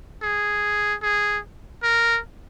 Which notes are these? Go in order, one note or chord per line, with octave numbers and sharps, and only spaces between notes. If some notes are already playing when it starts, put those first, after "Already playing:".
G#4
G#4
A#4